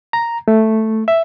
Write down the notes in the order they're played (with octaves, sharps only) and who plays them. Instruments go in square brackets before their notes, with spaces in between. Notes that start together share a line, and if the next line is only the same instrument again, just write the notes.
[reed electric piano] A#5
A3
E5